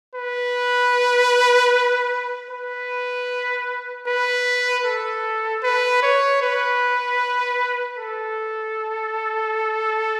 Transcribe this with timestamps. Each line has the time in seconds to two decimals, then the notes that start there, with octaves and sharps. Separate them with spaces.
0.15 B4
2.50 B4
4.07 B4
4.85 A4
5.63 B4
6.03 C#5
6.42 B4
7.98 A4